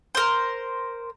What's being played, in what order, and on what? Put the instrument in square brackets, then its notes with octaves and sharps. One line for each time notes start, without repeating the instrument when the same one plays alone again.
[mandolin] A#4 C5